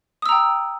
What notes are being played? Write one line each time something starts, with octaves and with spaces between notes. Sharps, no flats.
G5 A#5 D#6 E6